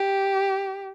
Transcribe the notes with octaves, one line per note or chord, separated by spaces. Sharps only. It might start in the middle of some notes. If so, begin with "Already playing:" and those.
Already playing: G4